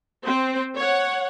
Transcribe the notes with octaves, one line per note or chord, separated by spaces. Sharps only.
C4 C5
C#5 F#5